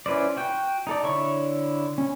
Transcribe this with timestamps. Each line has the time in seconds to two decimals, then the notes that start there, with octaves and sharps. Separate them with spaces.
0.06 C#4 E4 B4 C5 D5
0.37 F#4 G5
0.87 D#4 A4 D5
1.03 D3 E4 C#5 C#6
1.98 C#4